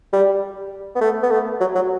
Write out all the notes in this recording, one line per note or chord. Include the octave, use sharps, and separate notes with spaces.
G3
B3
A3
B3
A3
F#3
F#3